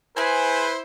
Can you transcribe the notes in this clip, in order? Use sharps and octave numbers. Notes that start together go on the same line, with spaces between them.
E4 G#4 B4 C5 G#5